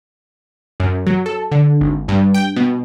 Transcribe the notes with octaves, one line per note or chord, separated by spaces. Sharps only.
F#2
F#3
A4
D3
G#1
G2
G5
B2